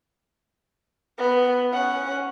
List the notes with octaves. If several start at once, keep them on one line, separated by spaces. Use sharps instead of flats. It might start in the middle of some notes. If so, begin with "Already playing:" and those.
B3
C#4 F#5